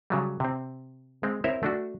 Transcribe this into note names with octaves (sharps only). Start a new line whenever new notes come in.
C#3 F#3 G3
C3 C4
G#3 C4
C4 E4 A#4 C5 C#5 E5
A3 D4 F#4